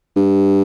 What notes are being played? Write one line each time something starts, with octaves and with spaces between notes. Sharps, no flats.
G2